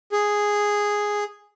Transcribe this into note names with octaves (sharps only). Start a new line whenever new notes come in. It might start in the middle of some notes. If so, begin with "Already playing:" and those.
G#4